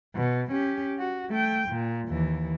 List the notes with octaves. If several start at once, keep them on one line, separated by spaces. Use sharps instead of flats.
B2
C#4 G4
F#4
A3 G5
A#2
D#2 E3